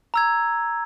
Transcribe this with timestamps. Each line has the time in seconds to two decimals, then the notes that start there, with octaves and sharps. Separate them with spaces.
0.14 A#5 E6 G#6